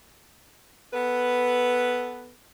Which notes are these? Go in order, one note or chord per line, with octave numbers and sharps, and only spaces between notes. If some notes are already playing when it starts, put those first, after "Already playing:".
B3 A4 B4